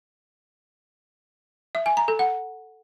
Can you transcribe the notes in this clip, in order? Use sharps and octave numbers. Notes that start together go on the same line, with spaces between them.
E5
G#5
A#5
A4
F#5